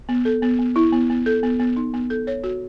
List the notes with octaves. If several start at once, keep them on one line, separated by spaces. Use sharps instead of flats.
B3
A4
B3
B3
E4
B3
B3
A4
B3
B3
D#4
B3
A4
C#5
F#4